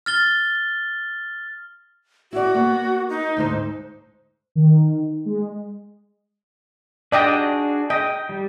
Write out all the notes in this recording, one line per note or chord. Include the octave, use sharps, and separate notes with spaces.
F6 A6 G7
E4 F#4 D5
A#3 B3
D#4
D2 G#2 C5
D#3
G#3
D4 F#4 G#4 D5 D#5 G5
D#5 G5
G3